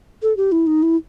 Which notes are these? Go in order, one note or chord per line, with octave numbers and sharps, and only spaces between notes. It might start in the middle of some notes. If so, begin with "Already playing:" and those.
A4
G4
E4
D#4
E4